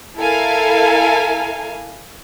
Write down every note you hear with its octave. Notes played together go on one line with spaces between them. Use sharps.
E4 A4 A#4 F5 G#5